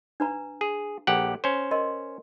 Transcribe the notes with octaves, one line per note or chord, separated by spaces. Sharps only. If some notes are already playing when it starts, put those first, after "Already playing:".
D4 B4 A#5
G#4
A#1 G4 A4 F#5
C#4 C5
A#4 D#5 C6